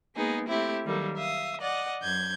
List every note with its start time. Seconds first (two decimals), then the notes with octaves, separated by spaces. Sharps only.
0.16 G#3 A#3 B3 D#4 G#4
0.49 A3 C4 E4 G4
0.84 D#3 F#3 G3 A#3 A4
1.15 E5 F5 D#6
1.60 D5 D#5 F#5
2.02 F#2 G6 G#6